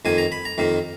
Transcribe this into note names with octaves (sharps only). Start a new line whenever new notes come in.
F2 D#3 A#3 G#5
A#5
B5
A#5
F2 D#3 A#3